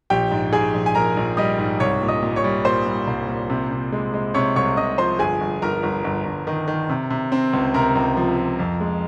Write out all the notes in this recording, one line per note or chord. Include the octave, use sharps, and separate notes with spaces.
A#1 G4 G5
G#2
G#2 G#4 G#5
A#1
G#5
A#1 A#4 A#5
A#1
G3 D#5 D#6
G#2
C2 C#5 C#6
A#2
D#5 D#6
A#2
C#5 C#6
G3
A#2 C5 C6
G3
C2
A#2
C3
C3
G#3
G#3
C3 C#5 C#6
C2 C#5 C#6
C3 D#5 D#6
F3 C5 C6
G1 G#4 G#5
G1
G1 A#4 A#5
G1
G1
G1
D#3
D#3
C3
C3
C4
C#2
C3 A#4 A#5
C#2
F3
F3
F2
G#3